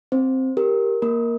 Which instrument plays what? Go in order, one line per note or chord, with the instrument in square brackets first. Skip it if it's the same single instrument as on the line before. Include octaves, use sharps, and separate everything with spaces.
[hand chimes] C4 C5
G4 A#4
A#3 A#4